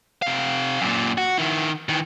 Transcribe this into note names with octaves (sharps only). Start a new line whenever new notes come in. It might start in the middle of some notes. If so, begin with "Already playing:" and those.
C3 F5
F#2 A#2
F#4
D#3 E4
D#3 E3